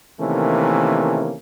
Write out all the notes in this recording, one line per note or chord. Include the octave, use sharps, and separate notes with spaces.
C3 D#3 E3 A3 A#3 C#4